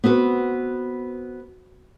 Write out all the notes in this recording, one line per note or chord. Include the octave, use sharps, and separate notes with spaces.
B3 C4 F#4 B4